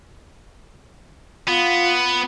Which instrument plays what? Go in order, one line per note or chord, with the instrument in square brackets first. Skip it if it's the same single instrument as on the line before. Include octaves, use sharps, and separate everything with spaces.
[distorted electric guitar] B3 [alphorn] F4